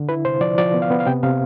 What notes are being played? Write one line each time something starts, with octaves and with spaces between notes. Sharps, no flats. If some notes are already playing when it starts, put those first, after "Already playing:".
Already playing: D3
E4 B4
C3 C5
F3 D5
F3 D5
B3
F5
B3
F5
C3 G5
C3 F5